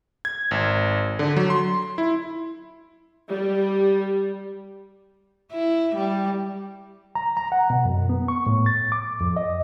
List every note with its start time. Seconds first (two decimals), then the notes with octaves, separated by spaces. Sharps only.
0.25 G#6
0.51 G#1
1.19 D3
1.36 F#3
1.50 C6
1.98 E4
3.30 G3
5.52 E4
5.95 G3
7.15 A#5
7.37 A#5
7.52 F#5
7.70 B2
7.85 F#2
8.09 B3
8.28 C#6
8.47 A2
8.66 A6
8.92 D6
9.21 F2
9.37 D#5